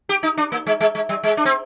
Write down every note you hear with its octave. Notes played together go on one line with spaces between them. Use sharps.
G4
D#4
D4
A#3
G#3
G#3
G#3
G3
G#3
D4
C4